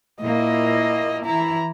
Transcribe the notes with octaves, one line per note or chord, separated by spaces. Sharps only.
A#2 A#3 E4 D#5
E3 E4 A#5